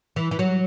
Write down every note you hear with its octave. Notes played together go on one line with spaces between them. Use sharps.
E3
E3
F#3